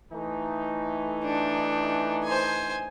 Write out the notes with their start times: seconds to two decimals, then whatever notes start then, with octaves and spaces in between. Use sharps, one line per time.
0.11 E3 A3 D#4
1.23 D4
2.25 C5 G#5